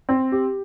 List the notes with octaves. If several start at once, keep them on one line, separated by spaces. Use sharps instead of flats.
C4
G4